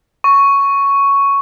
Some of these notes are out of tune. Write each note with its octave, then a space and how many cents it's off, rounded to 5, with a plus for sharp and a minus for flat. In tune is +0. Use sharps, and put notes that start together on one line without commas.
C#6 +5